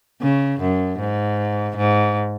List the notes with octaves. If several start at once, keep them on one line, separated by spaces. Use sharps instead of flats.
C#3
F#2
G#2
G#2